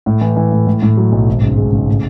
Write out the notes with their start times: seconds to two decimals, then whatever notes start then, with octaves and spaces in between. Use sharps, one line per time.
0.06 A2
0.21 E3
0.36 E3
0.52 A2
0.67 A2
0.82 A2
0.97 F#3
1.12 B1
1.27 G#1
1.43 C#3
1.58 G#3
1.73 C#3
1.88 A2